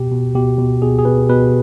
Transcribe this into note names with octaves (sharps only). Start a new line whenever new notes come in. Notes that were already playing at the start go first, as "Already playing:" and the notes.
Already playing: B2 G4
B2
B2 G4
B2
B2 G#4
G#4
B2 B4
B2 B4